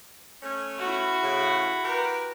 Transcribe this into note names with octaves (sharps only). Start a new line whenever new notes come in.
A3 C#4
E4 F#4
A2 C#3
G4 A#4 B4